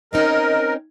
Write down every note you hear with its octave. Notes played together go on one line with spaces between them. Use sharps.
C4 C#4 D#4 A#4 D#5